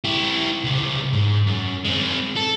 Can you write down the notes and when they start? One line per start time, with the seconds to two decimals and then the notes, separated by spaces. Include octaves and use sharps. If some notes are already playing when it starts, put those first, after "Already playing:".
0.04 E4 G4
0.64 C#2 C3
1.13 G#2
1.47 F#2
1.85 G#3 C4
2.36 A4